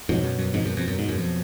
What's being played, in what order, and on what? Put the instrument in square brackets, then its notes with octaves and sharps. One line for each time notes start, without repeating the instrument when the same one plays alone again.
[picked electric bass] F2 G#2 [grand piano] B2 F#3 B3
[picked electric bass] F#2
F#2
F2 G#2
F#2
F2
F#2
G#2
F#2
F2